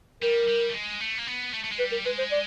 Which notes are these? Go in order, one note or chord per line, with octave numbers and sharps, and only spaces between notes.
G3 A#4
G3
A3
G#3
A3
A#3
B3
A3
A3
G#3
G3 B4
A#4
G#3 B4
C5
D5